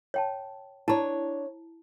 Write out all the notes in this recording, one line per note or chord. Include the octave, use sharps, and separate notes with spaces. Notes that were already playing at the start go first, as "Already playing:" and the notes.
C#5 G5 A5
D4 E4 C#5 A5 A#5